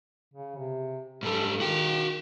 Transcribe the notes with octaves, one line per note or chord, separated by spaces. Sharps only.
C#3
C3
G#2 G3 A4
D#3 F#4 G5